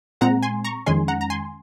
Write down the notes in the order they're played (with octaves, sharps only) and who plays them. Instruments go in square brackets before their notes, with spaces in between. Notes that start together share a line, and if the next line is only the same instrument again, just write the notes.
[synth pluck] A#2 G#3 C4 F#5 A#5
G#5 C6
A#5 C#6
F2 D#3 G#3 C#4 G#5 C6
F#5 A#5
A#5
G#5 C6